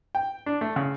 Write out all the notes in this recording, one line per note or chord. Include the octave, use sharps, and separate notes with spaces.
G5
D4
A3
C#3